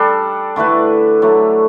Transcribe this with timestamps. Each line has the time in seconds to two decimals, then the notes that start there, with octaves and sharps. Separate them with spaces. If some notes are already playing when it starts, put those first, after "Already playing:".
Already playing: G3 D4 A4
0.56 D3 A3 E4 B4
1.22 D3 F#3 A3